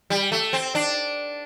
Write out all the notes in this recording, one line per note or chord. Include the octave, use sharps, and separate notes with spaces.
G3
A3
C4
D4